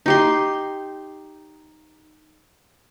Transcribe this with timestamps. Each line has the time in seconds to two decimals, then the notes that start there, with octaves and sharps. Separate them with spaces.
0.06 D#4 G4 C6